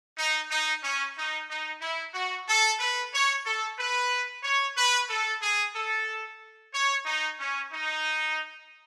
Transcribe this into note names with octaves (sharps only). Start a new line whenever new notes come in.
D#4
D#4
C#4
D#4
D#4
E4
F#4
A4
B4
C#5
A4
B4
C#5
B4
A4
G#4
A4
C#5
D#4
C#4
D#4